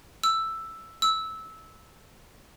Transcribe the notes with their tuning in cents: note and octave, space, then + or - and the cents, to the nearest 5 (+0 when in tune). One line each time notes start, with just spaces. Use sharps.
E6 +5
E6 -15